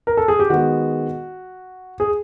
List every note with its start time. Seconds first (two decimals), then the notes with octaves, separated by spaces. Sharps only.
0.07 A#4
0.17 A4
0.28 G#4
0.40 G4
0.50 D#3 G#3 B3 F#4
2.00 G#4